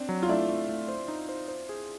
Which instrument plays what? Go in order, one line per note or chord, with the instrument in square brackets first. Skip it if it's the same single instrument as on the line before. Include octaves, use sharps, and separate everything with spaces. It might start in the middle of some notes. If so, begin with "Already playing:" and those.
Already playing: [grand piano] C4 D4
[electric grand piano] F#3
[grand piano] F4
[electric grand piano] A3 [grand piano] D4 E4
[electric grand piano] A3
A3
C5
D#4
C5
C5
G#4